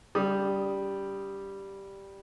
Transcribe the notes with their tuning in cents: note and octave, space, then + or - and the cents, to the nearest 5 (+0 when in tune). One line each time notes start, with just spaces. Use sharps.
D3 -45 G3 +0 D#6 +0